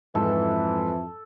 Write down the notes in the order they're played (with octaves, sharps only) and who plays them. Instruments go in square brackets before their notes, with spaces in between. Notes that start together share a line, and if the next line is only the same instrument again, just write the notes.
[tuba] F2 [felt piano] G#2 [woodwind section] E3 [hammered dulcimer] A4